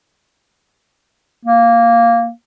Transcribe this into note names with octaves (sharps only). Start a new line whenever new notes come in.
A#3